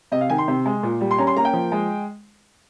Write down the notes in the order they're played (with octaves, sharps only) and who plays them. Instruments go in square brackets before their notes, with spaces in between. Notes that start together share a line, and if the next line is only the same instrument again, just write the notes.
[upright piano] C3 D#5
F5
D#3 G#5
C6
C3
G#3
A#2
G3
C6
C#4 A#5
C6
A#3 A#5
G5
F3
G#3